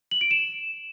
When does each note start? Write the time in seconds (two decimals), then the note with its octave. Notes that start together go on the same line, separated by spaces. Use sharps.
0.11 F#7
0.21 D7
0.31 E7